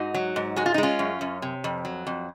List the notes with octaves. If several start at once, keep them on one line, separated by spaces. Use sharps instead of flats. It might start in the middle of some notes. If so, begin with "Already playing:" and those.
Already playing: G#2 D#4 F#4
F#3
G#2
G#3 F#4
F4
D#4
G#3
C#4 F4
F#2
F#2
C3
F2
F#3
F2